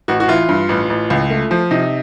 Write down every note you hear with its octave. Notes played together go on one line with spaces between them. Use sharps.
A1 F#4
F#4
E3 F4
G2
A1
A1
C#2
A3
F3
C3 D#4